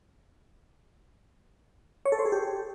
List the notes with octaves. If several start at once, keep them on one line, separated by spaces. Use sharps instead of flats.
C#5
A4
C5
G#4
G4